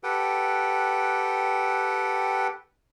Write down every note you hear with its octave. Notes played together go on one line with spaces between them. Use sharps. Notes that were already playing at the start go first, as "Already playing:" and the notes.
G4 A4 B4 F#5 G5